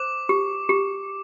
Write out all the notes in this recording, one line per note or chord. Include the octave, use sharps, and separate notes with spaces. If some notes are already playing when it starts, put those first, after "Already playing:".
Already playing: C5 D6
G4
G4